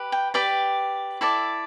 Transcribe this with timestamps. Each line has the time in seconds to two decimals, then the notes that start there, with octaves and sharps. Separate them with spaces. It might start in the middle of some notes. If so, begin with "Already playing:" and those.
Already playing: G4 B4
0.12 G5
0.34 G4 B4 D5 G5
1.21 E4 A4 D5